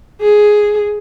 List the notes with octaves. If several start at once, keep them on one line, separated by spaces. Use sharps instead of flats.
G#4